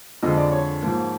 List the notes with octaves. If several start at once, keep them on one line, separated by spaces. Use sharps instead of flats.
F2 D3 F3 G#3 D#5
D5
C#5
G#2 F3 A#3